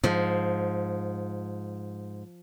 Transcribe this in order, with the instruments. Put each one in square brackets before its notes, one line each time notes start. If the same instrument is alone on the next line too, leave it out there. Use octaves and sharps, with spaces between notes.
[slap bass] G#2 [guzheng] F3